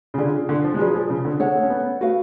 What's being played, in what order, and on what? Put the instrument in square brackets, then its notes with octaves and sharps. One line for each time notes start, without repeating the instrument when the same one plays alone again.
[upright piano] C#3
[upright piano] D3 [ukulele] F4 G#4 D5
[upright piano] D3
F3
G#3
[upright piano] F#3 [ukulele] F4 G#4 B4 D5
[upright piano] F3
C#3
D3
[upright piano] G#3 [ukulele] A4 C#5 F#5 A5
[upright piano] A3
C#4
B3
[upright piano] A3 [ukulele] F#4 B4 F5